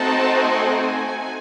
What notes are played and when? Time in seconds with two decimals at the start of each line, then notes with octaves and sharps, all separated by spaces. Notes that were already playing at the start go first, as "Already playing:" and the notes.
Already playing: A3 C4 D#4 F#4 A5
0.33 G#5